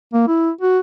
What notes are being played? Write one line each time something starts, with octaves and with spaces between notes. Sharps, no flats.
A#3
E4
F#4